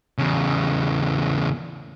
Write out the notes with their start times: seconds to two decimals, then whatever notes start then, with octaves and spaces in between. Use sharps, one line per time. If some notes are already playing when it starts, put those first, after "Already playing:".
0.18 E2 C#3